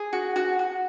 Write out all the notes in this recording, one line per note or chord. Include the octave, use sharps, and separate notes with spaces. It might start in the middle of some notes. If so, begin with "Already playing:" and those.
Already playing: G#4
F#4
F#4
F#4